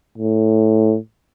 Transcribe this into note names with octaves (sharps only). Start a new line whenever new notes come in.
A2